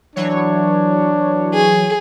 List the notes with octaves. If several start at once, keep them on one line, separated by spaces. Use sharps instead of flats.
E3 F#3 D4 C#5
G#4